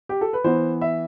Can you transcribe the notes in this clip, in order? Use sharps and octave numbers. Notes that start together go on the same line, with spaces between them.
G4
A4
B4
E3 B3 C5
E5